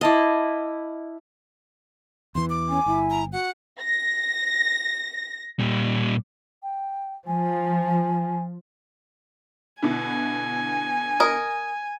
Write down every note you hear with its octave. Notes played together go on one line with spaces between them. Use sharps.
E4 D#5 F5 A5 D6
E2 E3 C6
D6
C#4 G#5
G1 E4
A#5
F#4 F#5
A#6
A#2 G3
G5
F3 G#5
B2 D3 E4 G#5
A#4 D#5